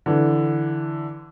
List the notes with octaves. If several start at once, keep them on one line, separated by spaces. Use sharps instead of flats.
D3 E3